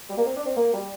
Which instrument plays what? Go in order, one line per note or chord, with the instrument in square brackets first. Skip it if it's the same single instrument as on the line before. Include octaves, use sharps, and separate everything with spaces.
[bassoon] G3
A#3
C4
D4
C4
A#3
G3